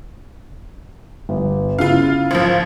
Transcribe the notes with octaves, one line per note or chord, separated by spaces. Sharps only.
G1
C#3 E4 F4 F5
G#1 F3